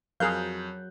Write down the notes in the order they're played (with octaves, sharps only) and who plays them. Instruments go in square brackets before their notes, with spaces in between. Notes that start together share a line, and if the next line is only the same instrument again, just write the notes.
[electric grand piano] F2 F#6 G6 [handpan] F#3 [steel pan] G#4 A#4 F5